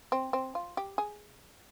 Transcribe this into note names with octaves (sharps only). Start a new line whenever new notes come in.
C4
C4
F4
G4
G#4